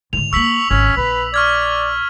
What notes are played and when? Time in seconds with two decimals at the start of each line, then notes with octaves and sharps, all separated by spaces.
0.13 G#2 D3 F7
0.33 G#3 A#3 C#6 E6 B6 F#7
0.71 G#1 C#4
0.97 A#1 B4
1.34 D5 C#6 F6 G#6